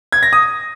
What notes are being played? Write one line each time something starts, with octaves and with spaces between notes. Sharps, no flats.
G#6
A#6
D#6